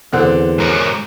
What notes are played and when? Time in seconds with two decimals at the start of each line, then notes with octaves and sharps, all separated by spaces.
0.13 E2 D3 C4 F#6
0.58 G#2 A#4 C#5